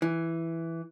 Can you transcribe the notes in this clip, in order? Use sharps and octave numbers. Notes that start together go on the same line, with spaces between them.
E3